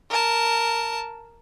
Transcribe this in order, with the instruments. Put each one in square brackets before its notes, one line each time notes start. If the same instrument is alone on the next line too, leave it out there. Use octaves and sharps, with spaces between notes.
[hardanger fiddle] A#4 A5